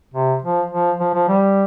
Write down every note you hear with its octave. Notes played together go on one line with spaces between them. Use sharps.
C3
F3
F3
F3
F3
G3